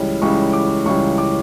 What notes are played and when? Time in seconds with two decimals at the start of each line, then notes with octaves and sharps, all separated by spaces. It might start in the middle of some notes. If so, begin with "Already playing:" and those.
Already playing: C#2 C#3 E3 G3
0.22 C#2 C#3 E3 G3 C#6
0.53 D6
0.86 C#2 C#3 E3 G3 C#6
1.18 D6